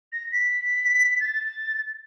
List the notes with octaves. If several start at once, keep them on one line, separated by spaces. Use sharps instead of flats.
A#6
B6
A6